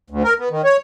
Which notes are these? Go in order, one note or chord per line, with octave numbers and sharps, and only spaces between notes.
D2
A#4
B3
D#3
C#5